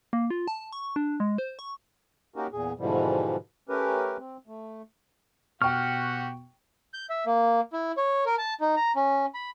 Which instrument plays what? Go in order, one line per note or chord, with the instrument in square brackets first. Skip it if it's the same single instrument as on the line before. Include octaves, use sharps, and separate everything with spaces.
[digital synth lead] A#3
F4
A5
C#6
D4
G#3
C5
C#6
[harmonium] A#3 C#4 D#4 F#4 G4 A#4
E2 A#2 G#4
G#2 B2 D3 E3 F3 G3
A3 C#4 G4 A#4 B4
C4
A3
[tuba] B2 [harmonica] F#4 G4 F#5 [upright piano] G5 C#6 [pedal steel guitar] F6
[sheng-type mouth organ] G6
E5
A#3
E4
C#5
A#4
A5
D#4
A#5
C#4
B5